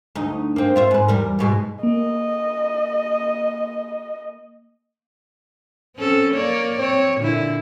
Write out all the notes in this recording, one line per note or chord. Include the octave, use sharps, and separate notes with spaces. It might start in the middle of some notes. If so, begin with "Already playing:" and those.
D2 D#4
A#3 C4
F4 C5 E5
G#2 B4
E2 G3 A#4
G#2 B2 G#3
A#3 D#5
C4 C#4 A4
A#3 C#5 D5
C4 C#5
A#2 D3 E4